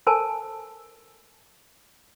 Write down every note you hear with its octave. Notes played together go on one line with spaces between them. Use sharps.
A4 A#4 C5 G#5 A5